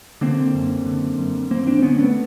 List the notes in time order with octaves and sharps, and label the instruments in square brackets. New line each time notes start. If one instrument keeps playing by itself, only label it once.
[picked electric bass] D3 A#3 C4
F#2
D3
F#2
D#2 A#3 C4
C4 D4
D3 B3 C#4
A3 B3